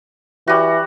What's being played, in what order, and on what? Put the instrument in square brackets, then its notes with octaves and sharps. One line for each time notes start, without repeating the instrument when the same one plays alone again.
[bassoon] E3 [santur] G3 F#4